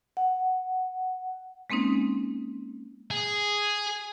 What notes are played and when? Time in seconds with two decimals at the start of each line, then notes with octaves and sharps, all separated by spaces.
0.17 F#5
1.70 G#3 A#3 C4 C#4 D#4
3.11 G#4